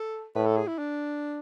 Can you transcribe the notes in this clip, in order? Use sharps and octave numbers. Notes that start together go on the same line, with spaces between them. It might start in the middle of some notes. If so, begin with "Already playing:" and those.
Already playing: A4
A2 B4
A4
G#4
E4
D4